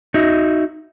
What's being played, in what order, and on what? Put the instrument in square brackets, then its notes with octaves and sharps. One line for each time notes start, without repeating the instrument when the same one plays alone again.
[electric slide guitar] D#4 F#4 D#5 E5